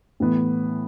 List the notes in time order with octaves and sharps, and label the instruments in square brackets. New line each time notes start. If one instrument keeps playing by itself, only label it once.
[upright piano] A2 E3 B3